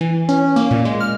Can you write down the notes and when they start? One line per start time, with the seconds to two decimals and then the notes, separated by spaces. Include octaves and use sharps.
0.01 E3
0.29 C#4
0.56 A#3
0.71 A#2
0.85 G#3
1.00 F6